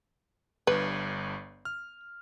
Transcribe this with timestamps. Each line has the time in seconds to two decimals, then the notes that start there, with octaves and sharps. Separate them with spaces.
0.67 G1 G2 B4
1.65 F6